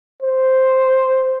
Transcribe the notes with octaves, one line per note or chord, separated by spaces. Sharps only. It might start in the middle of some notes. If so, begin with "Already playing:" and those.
C5